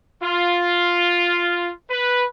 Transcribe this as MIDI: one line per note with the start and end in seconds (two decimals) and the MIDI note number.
0.23 1.71 65
1.90 2.25 71